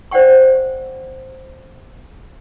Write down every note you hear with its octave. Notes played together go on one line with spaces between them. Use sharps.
C5 D5 F#5 G5 C#6